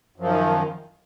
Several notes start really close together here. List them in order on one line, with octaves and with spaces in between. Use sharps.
F#2 F3 D#3